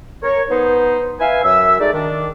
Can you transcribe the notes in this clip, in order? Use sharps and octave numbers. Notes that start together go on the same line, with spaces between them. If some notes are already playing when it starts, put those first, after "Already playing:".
A#4 C#5
B3 D#4 C5
B4 E5 F5 G#5
F#2 E5 E6
G#3 A3 D#4 D5
D#3 D4